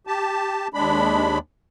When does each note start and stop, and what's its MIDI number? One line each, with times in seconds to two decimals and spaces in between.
0.07 0.68 67
0.07 0.68 81
0.74 1.38 39
0.74 1.38 56
0.74 1.38 62
0.74 1.38 83